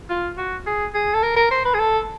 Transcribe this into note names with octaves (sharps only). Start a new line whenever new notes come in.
F4
F#4
G#4
G#4
A4
A#4
A#4
C5
B4
G#4
A4